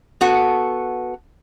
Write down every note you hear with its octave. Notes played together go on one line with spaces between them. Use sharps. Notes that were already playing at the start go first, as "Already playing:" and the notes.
B3 F#4 A4